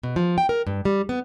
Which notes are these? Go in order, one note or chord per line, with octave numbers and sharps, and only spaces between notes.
B2
F3
G5
A#4
G2
G3
B3